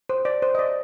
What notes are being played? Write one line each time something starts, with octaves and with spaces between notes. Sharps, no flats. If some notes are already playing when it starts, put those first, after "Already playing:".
C5
D5
C5
D#5
D5